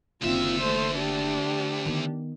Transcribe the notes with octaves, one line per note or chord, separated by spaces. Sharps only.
F#1 D2 D#3 C4 F4 E5
A3 C5
D4 G4
D#3 B3